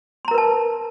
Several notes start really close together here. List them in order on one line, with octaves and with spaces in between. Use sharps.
C6 A#5 A#4 B4 A5